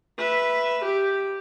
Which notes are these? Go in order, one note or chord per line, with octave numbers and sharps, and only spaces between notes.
B4 E5
G4